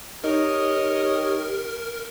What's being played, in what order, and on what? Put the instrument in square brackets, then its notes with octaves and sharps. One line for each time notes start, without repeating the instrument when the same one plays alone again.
[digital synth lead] D#4 [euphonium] G4 [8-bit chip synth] A#4 [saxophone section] C#5 D#5